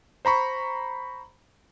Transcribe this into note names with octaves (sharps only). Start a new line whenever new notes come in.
C5 A#5 B5 C#6